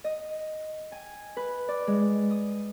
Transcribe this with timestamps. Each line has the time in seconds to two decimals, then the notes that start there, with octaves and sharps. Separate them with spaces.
0.04 D#5
0.92 G#5
1.37 B4
1.68 D5
1.87 G#3
2.30 D#6